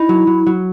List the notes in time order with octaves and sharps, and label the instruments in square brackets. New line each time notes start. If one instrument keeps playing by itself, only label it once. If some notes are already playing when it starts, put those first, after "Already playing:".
Already playing: [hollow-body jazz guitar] D#4 [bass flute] E4
[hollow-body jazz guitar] F#3
F#3
F#3